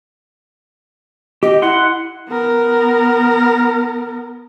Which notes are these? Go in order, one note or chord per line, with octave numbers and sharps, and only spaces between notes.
G4 D#5
E4 F#5 C6
B3 A#4